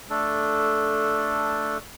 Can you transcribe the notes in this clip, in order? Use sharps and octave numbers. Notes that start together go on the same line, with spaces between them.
A3 D4 A4